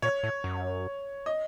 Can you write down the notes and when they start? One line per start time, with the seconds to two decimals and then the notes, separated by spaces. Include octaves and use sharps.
0.02 A#2 C#5
0.23 A2
0.44 F#2
1.26 D#5